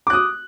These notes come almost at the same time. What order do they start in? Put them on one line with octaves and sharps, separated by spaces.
D6 F#6 D#6